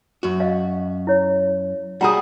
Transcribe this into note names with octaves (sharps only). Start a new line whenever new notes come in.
F#2 F#4
D#5 F5
E4 C#5
G3 F#4 G#4 F#5 A#5 D#6